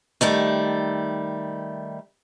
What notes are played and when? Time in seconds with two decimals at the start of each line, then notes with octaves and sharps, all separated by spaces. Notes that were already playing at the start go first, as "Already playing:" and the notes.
0.21 D#3 G3 A3